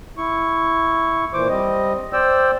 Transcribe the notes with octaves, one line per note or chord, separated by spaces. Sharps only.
E4 C#6
A#2 E3 C5 D6
G3 C4 D#5
C5 D5 G5 E6